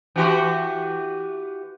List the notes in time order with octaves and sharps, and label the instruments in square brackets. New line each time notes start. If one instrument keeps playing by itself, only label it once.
[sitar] E3 F#4 G4